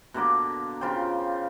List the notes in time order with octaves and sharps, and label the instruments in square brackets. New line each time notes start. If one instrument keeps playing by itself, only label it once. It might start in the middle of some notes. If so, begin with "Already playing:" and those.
[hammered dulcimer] B2 D3 A#3 D6
C#3 F4 C5 G5